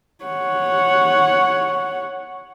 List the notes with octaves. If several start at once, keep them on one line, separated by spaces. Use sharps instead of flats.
C#5 F#5